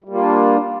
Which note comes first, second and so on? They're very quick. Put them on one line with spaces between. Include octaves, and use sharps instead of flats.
G3 A#3 F4 D4